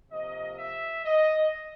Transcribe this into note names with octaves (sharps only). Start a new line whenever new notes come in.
C3 F3 A#3 D#5
E5
D#5